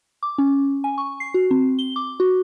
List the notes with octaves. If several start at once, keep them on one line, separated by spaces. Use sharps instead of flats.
D6
C#4
G#5
C#6
C7
F#4
C4
G7
D6
F#4